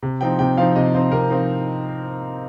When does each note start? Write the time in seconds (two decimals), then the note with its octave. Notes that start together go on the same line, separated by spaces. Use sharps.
0.02 C3
0.21 F3 C4 D#4 G5
0.39 C3 G5
0.57 F3 C4 D#4 F5
0.76 C3 D#5
0.94 F3 C4 D#4 C5
1.12 C3 A#4
1.30 F3 C4 D#4 C5